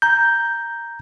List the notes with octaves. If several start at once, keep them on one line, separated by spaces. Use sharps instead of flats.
A#5 G6